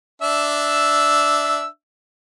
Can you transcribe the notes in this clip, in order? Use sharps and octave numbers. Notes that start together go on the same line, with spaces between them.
D4 E5 E6